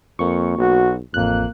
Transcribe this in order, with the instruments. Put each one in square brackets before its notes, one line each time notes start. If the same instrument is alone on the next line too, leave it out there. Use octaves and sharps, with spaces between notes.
[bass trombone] F2 [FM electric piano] A#3 C#6
[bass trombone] B1 [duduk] F#4
[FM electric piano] A1 F#6 [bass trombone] F2 [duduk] A#3